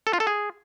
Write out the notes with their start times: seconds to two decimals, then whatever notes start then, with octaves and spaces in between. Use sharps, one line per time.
0.07 A4
0.13 F4
0.20 A4
0.27 G#4